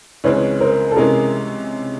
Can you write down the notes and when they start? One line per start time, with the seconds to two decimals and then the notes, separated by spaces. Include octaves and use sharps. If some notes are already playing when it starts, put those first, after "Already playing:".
0.24 C#2 C#3 E3 G#3 C4 B4 C#5
0.60 A#4 C5
0.91 A4
0.96 C3 E3 G#3 C#4 G#4 A#4